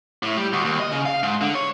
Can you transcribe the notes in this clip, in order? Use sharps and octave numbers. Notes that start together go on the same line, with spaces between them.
A2
G3
D2
D#2
D#5
C#3
F5
G#2
D3
C#5